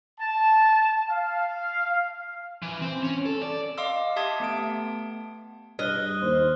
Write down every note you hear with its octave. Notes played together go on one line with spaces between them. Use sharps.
A5
F5
E3
C4
C#4
A4
D5
D#5 F5 C6 D6 E6
G4 E5 A5 C6 D#6 G#6
A3 B3 A5 D7
G2 D#5 F6 F#6 G7
D#2 C5